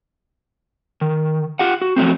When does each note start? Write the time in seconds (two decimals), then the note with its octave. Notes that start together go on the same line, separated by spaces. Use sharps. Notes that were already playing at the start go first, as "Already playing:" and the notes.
1.01 D#3
1.59 F4 G4 F#5
1.82 F#4
1.96 F3 F#3 A3 C4